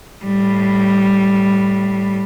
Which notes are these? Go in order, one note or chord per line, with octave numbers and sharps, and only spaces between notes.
A2 G3